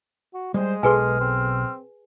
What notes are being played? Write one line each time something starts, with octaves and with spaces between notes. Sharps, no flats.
F#4
G3 G#3 C5
B1 G#4 A4 B4 G#5 C6 F6
C4